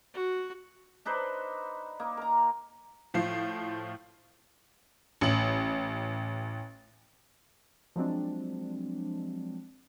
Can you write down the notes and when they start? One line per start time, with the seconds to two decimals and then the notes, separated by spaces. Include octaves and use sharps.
0.14 F#4
1.05 D4 D#4 B4 C5
2.00 A#3 D#4
2.17 A#4 A#5
3.14 A2 F3 F4 C7
5.21 A1 F#7
7.96 F3 F#3 G#3 C4 D4